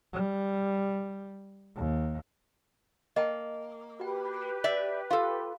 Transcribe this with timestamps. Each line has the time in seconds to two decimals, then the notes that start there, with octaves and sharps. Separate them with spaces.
0.13 G3
1.76 D#2
3.16 A#3 D#5 G5 A5
4.00 F#4 G4 B4 G5
4.64 D5 E5
5.10 F4 A4 F5